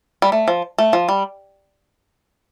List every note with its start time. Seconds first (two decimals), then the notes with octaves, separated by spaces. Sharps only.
0.22 G3
0.32 A3
0.48 F3
0.78 A3
0.93 F3
1.09 G3